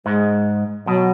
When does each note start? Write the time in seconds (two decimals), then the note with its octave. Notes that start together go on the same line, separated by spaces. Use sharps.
0.06 G#2 G#3
0.87 B2 F#3